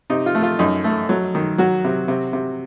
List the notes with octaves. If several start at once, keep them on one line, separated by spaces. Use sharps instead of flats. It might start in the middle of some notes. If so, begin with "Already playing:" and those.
C3 D#4
F4
A3
F4
F#2 D#4
A3
F#3
D#3
F#3 F#4
C3
C3
C3